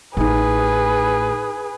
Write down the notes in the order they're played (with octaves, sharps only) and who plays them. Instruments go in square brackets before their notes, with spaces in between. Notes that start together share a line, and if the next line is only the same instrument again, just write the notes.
[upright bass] A1 D#4 [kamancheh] G#4 B4